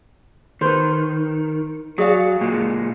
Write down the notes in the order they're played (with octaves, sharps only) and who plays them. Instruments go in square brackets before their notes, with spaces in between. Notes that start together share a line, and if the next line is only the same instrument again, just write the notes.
[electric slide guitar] D#3 [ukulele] B4 C5
[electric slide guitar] F#3 [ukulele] G#4 D5 F5
[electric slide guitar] A#2 G#3